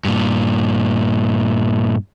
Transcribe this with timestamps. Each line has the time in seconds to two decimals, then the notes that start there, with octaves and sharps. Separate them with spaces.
0.05 G2 A#2